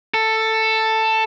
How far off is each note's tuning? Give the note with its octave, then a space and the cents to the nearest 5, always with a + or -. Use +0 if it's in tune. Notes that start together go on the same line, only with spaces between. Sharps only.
A4 +10